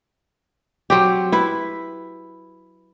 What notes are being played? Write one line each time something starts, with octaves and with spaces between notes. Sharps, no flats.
F#3 C4 G4
E4 B4